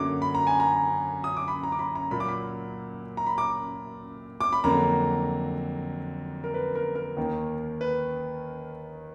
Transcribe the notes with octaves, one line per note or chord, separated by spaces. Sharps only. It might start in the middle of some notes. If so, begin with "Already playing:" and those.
Already playing: F#2 D3 F#3 A#3 D6
B5
A#5
G#5
A#5
D#6
D6
B5
A#5
D6
B5
A#5
A#2 F#3 A#3 B5
D6
B5
A#5
B5
D6
D6
B5
F2 D3 F#3 A#3 A#5
A#4
B4
A#4
A#4
D#2 D#3 A#3
B4